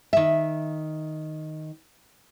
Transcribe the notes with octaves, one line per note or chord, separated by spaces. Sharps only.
D#3 E5